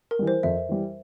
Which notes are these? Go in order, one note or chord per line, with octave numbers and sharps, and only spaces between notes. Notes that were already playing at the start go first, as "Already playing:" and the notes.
A#4
E3 G3
C5
F2 E5
E3 G3